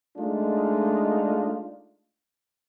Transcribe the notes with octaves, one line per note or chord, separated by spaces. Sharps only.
G#3 A3 D4 D#4 F4